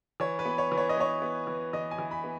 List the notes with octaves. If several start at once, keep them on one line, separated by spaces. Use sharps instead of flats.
E3 C#5
B4
B3
C#5
E3
C#5
D#5
B3 C#5
B3
E3
E3 D#5
G#5
E3
B5
B3